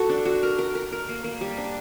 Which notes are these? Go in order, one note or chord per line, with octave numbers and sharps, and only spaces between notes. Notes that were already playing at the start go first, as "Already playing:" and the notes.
Already playing: F#4 A4
D4
F#4
A#4
A#4
A#4
A#4
A#3
A#3
G3
D4